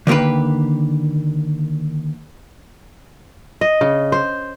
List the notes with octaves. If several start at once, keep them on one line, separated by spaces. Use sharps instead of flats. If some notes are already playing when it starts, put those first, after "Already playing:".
D3 D#3 A#3 G4 B4
D#5
C#3
C5